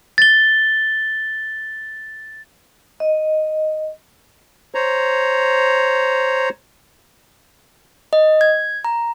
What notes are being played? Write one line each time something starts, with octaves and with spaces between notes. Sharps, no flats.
A6 G7
D#5
C5 C#5 A#5
D#5
G#6
A#5